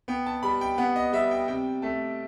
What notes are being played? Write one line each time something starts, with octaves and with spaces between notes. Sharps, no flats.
B3 G5
A5
G3 B5
G5
B3 F#5
D#5
G3 E5
G5
C3 G5
A3 A5